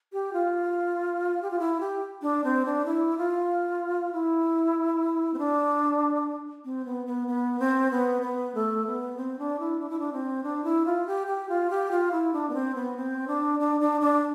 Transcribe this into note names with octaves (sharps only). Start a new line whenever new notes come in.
G4
F4
G4
F4
E4
G4
D4
C4
D4
E4
F4
E4
C4
D4
C4
B3
B3
B3
C4
B3
B3
A3
B3
C4
D4
E4
D4
E4
D4
C4
D4
E4
F4
G4
G4
F4
G4
F4
E4
D4
B3
C4
B3
C4
D4
D4
D4
D4